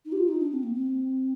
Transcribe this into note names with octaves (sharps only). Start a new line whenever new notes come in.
D#4
G4
F4
D#4
D4
C4
A#3
C4